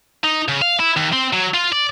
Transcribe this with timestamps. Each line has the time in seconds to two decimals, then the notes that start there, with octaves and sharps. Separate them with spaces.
0.24 D#4
0.49 C#3
0.62 F5
0.80 E4
0.97 D#2
1.13 C4
1.33 F#3
1.54 F4
1.72 D5